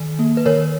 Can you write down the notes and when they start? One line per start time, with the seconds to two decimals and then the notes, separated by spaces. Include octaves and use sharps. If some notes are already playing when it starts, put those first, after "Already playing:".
Already playing: D#3
0.19 A#3
0.37 B4
0.46 D#3 A#4 C#5